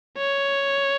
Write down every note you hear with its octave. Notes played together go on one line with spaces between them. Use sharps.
C#5